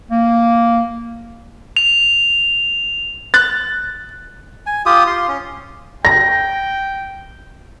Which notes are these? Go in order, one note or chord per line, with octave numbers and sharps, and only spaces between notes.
A#3
F7
F#6 A6
G#5
F4 G4 D#6
F4 C6
C#4
G5 A#6